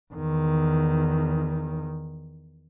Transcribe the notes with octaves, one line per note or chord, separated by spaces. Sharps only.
E2 D#3